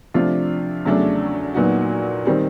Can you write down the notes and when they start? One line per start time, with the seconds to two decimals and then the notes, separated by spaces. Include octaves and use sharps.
0.14 C3 F3 A3 D4 F4
0.85 E2 C#3 F#3 A3 D4
1.55 A#2 F#3 B3 D#4 F#4
2.25 D#3 G3 C4 D#4